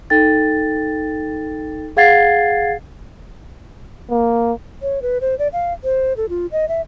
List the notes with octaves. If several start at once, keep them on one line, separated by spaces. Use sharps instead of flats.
D#4 A4 G5 A6
G#4 F5 F#5 G#6 A6 C7
A#3
C#5
B4
C5
D5
F5
C5
A4
F4
D#5
E5